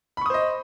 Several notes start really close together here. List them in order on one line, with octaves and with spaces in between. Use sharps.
B5 C#6 D#6 C5 D#5